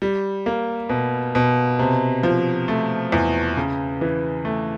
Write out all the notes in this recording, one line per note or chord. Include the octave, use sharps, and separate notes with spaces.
G3
A#3
B2
B2
C3
F3
A3
E2
C#3
E3
A3